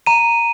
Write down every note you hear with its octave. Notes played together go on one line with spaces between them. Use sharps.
A#5 D#7